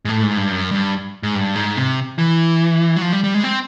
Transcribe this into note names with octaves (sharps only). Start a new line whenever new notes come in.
G#2
A2
G#2
G2
F#2
G2
G#2
G2
G#2
C3
E3
F#3
F3
G3
G3
G#3
C4